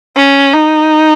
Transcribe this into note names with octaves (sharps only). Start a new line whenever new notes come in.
C#4
D#4